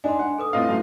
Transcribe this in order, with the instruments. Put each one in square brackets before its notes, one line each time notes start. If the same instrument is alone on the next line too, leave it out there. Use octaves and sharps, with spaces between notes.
[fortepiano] D4 D#4 [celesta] G#5 C6
[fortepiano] F#5
[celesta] A4 B4 D#6
[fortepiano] A2 C4 [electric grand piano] F4 D#5 F5
[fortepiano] F#2 A2